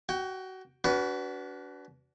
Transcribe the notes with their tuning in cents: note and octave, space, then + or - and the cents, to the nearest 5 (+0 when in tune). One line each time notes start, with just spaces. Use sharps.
F#4 +25 G5 +0
D4 -35 F#4 +25 B4 +0